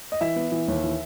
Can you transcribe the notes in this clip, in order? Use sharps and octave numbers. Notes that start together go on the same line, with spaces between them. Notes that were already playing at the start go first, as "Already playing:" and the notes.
D#5
E3 E5
B3
E3
D#2
E3